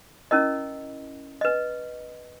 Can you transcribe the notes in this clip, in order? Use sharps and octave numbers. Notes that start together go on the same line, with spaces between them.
C#4 E4 A#4 D#5
B4 D#5